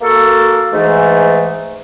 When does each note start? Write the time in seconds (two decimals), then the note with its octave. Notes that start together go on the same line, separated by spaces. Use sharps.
0.01 A#3 F#4 A4
0.72 G#2 E3 A3